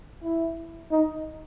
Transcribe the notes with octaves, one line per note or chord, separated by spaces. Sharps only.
E4
D#4